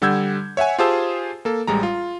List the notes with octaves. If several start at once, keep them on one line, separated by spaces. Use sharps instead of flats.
D3 G3 F#5 E6 G6 G#6
C#5 E5 F#5 G#5
F4 G4 G#4 C5 A5 E6
A#3 A4
A1 G3 G#3 A#5
F4